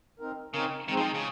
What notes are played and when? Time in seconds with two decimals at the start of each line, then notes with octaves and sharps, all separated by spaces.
0.19 C4 D#4 A#4
0.54 C#3 C4 D#4 A#4
0.88 D#3 G#3 C4 D#4
0.97 F3
1.05 D#3
1.14 C#3